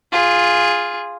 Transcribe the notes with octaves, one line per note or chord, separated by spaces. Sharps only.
F4 G#4